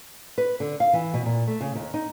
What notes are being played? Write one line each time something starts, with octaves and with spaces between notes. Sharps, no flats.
B4
D3
F5
E3
B2
A#2
A3
C#3
D#2
D#4